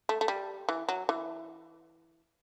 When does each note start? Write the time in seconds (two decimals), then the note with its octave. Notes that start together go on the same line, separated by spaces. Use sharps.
0.09 A3
0.21 A3
0.28 G3
0.69 E3
0.89 F#3
1.09 E3